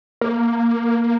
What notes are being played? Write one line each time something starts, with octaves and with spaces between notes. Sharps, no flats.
A#3